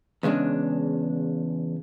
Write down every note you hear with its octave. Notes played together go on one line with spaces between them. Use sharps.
E2 C#3 G#3 D4